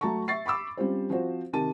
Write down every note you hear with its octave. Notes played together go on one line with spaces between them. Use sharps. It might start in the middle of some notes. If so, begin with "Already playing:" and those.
F#3 A3 A5 A#5 C#6
E5 C#6 A6 C7
B5 C#6 D6 E6
G3 C4 C#4 F4 G4 C5
F3 C4 F#4 C5
C3 D#3 G4 A5 D#7